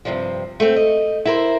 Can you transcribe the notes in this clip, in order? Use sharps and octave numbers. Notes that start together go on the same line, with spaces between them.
G2 C3 F3
A3 C4
D#5
E4 A#4 C5